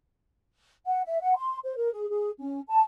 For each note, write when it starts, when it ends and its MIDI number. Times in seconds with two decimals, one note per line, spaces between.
0.86 1.01 78
1.06 1.21 76
1.21 1.34 78
1.36 1.58 84
1.64 1.75 72
1.77 1.90 70
1.93 2.09 68
2.09 2.31 68
2.39 2.61 61
2.69 2.82 81